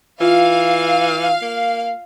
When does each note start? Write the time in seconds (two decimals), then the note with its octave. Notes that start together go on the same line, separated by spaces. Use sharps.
0.20 E3 F4 F5
1.42 A#3